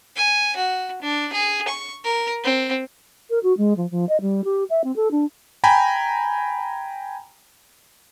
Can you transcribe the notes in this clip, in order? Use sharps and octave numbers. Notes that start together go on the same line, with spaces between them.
G#5
F#4
D4
G#4
C#6
A#4
C4
A#4
F#4
G#3
F3
F3
D#5
G3
G4
E5
C4
A4
D4
G5 G#5 A#5 B5